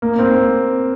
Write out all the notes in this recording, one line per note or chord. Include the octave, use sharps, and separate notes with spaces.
A#3
C4